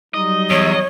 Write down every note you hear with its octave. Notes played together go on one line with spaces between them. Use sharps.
F#3 G3 D#4 D#5
E2 C#5